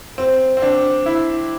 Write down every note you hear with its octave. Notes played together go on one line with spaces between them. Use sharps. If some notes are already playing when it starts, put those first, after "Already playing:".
C4
C4
D4
E4